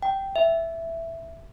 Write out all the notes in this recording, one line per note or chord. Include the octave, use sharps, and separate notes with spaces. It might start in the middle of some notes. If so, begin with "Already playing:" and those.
G5
E5